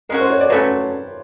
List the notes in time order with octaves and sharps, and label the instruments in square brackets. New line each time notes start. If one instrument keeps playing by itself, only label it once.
[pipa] G#3 C#4 F#4 [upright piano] A#4
[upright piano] C5
C#5
D5
[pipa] F#3 A3 C#4 [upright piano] B4